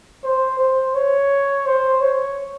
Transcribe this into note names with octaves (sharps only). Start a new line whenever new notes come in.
C5
C5
C#5
C5
C#5